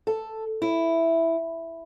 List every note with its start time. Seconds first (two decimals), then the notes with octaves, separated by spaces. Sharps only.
0.07 A4
0.62 E4